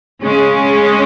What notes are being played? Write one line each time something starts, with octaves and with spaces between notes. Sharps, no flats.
C#3 G#3 C#4